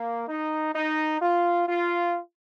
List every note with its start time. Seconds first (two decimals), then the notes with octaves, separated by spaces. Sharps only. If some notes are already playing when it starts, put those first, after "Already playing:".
Already playing: A#3
0.28 D#4
0.74 D#4
1.21 F4
1.68 F4